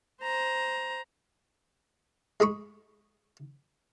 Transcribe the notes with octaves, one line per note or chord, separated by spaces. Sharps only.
C5 A#5
G#3 G#4 B5 C#6